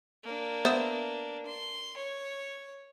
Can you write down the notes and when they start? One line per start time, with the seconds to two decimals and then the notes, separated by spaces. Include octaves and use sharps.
0.24 A#3 D4
0.65 B3 C5 E5
1.46 C6
1.97 C#5